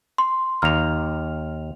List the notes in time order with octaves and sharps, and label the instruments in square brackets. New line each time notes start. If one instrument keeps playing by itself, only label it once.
[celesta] C6
[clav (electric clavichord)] D#2 A#5 [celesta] F6 F7